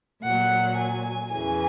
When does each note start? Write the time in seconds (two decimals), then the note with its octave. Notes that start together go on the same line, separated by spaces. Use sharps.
0.23 A#2 F#3 F#5
0.77 G#5
1.31 E2 C#3 E3 G#5